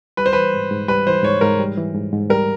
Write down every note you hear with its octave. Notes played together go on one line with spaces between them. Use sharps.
G3 B4
C5
E3 B4
G#2
G#2
G3 B4
E3 C5
G#2 C#5
G#2 A#4
G3
E3
G#2
G#2
G3 A#4